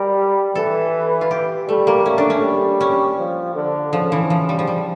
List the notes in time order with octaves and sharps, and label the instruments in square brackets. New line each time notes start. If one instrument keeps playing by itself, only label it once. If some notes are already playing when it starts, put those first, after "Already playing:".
Already playing: [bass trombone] G3 [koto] A#4
[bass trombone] E3 [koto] A4
[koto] F4
G4
[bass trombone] G3 [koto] A3
[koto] A#3
[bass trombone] A3 [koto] C#4
[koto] D4
C#4
[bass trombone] G3
[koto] C#4
[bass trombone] F3
D3
[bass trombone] C#3 [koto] F3
[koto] E3
F3
G3
F3
G3